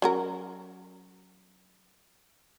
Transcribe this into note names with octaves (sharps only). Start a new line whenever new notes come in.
F#3 C#4 A#4